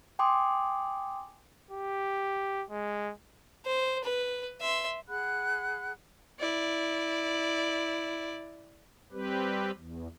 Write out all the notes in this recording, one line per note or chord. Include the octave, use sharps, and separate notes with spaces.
G5 G#5 C6 D6 D#6
G4
G#3
C5
B4
E5 C6
G#4 F#5 B5 F#6
E4 D5
G3 C4 G4 B4
E2